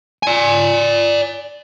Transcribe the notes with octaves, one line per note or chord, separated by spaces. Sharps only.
D5 G#5